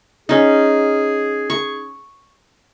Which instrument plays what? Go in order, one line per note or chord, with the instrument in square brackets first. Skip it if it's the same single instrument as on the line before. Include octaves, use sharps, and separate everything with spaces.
[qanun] C#4 D#4 [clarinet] G#4
[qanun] C#6